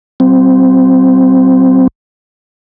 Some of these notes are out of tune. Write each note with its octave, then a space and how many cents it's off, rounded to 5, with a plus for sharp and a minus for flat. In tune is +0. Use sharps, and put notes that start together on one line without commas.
F#3 +45 C4 -5